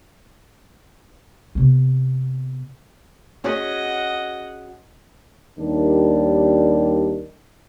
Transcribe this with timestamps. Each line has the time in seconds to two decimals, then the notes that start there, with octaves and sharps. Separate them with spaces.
1.55 C3 B3
3.44 C#4 F#4 G#4 D#5 F#5
5.58 D#2 D#3 G3 D4